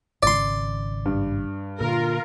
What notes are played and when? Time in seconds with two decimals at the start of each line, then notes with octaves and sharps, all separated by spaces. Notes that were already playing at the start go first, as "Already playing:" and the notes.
0.23 G#1 C#3 D5 C6
1.06 G2
1.81 A#2 D3 F4 A#4